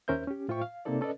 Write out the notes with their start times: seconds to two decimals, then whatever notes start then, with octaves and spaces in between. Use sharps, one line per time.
0.08 D#2 C#4 A#4 C5 E5 G6
0.27 C#4 G4
0.49 A2 F4 C5 E5 G5 C#6
0.61 F5
0.85 C3 A#3 C4 D#4 A4 D5
1.01 C#4 A4 B4 D5 D#5